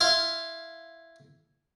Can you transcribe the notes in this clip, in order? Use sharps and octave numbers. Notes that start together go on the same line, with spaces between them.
E4 F5 C6